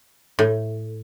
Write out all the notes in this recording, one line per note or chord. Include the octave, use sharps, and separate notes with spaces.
A2